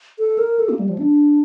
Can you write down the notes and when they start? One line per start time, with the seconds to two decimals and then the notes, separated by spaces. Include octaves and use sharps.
0.19 A4
0.38 A#4
0.59 A4
0.69 A#3
0.79 G3
0.89 F3
0.98 D4